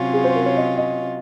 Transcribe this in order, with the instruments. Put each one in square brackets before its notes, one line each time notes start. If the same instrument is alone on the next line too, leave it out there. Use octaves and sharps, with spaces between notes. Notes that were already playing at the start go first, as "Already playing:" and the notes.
Already playing: [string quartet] C3 F#3 C#4 F4
[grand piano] G#4
C5
A#4
C#5
D#5
D#5